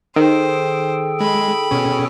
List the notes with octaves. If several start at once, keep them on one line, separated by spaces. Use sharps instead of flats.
D#3 G#4 A4 C5 G5
G#3 B5
B2 C#4